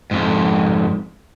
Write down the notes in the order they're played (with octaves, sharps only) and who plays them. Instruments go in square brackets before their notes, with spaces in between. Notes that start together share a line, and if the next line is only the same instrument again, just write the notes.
[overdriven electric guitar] F2 G#2